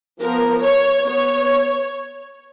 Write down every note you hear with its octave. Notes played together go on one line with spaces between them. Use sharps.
F3 B3 A#4
C#5
B3 C#5